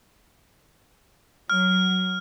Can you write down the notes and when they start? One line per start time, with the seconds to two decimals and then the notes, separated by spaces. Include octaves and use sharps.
1.50 F#3 F6